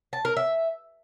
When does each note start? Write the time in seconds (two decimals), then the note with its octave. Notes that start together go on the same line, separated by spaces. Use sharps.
0.13 A5
0.25 A#4
0.37 E5